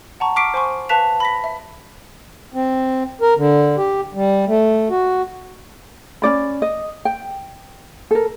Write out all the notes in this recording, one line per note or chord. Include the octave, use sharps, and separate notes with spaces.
F#5 A5 A#5 C#6
C#6 D6 F6 B6 C7 D7
C5 G#5 C6 C#6
B4 F5 A5 F#6 B6 F7
B5 A#6 B6
E5
C4
A#4
D3
G4
G3
A3
F#4
C#4 D#4 D5 B5
D#5
G5
A4 A#4